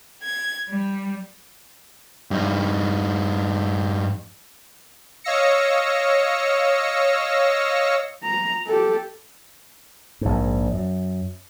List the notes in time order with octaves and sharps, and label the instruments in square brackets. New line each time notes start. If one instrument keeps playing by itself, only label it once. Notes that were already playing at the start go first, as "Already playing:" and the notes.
[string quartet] G#6
G3
[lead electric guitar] G2 D#4
[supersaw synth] C#5 D#5 F5 E6 A#6 C#7
[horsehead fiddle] A#5
G4 A4
[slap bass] A#1 G#2
F#2